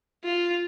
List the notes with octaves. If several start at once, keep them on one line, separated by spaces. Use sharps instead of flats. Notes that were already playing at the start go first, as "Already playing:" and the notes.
F4